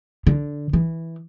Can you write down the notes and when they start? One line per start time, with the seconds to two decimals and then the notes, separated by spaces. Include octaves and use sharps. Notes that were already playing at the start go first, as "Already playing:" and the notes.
0.27 D3
0.73 E3